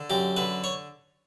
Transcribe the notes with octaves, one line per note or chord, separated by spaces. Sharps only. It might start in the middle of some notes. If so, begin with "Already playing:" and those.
Already playing: D3
F#2 G4
D3 B4
C#5